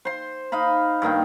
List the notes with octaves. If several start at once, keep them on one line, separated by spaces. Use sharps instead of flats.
C5 C6
D#4 D#5 F5 B5
G2 D#3 A#3 G5